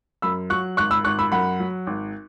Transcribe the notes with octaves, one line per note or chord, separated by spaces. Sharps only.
F#2 B5 E6
F#3 C#6 F#6
G#1 C#6 F#6
B5 E6
G#1 C#6 F#6
B5 E6
F#2 F#5 B5
F#3
G#1